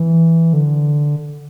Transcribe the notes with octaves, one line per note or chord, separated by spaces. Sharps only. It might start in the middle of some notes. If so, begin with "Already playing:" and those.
Already playing: E3
D3